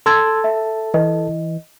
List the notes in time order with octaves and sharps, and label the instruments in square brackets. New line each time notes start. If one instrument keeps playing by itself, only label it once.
[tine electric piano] A4 A5 [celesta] C6 E6 G#6
[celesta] E5
[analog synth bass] E3 [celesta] D#5